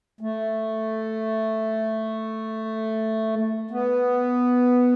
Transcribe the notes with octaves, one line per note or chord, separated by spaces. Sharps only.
A3
B3